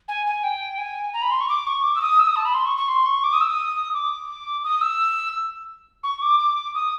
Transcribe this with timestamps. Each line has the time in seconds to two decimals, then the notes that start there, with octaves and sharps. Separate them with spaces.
0.08 G#5
0.26 G#5
0.43 G5
0.78 G#5
1.14 A#5
1.22 B5
1.31 C6
1.41 C#6
1.49 D6
1.67 C#6
1.83 D6
1.96 E6
2.01 D#6
2.19 E6
2.28 D#6
2.36 A5
2.45 B5
2.54 C6
2.66 C#6
2.77 C#6
2.88 C6
3.06 C#6
3.24 D6
3.33 D#6
3.41 E6
3.49 D#6
3.94 D6
4.64 D#6
4.81 E6
6.03 C#6
6.22 D6
6.40 D6
6.75 D#6